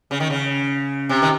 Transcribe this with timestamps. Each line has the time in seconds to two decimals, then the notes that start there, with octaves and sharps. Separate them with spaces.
0.11 C#3
0.20 D#3
0.30 C#3
1.09 C3
1.22 D#3